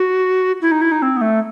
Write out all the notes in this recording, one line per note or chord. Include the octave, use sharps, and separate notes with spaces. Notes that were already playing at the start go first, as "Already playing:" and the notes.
Already playing: F#4
E4
D#4
E4
D#4
C4
B3
A3